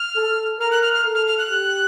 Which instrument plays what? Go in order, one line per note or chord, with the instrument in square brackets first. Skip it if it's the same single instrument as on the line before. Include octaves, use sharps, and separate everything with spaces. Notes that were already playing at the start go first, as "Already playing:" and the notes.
Already playing: [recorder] F6
[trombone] A4
[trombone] A#4 [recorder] F6
[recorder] F#6
F6
F6
[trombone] A4
[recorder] F6
F6
F#6
[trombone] G4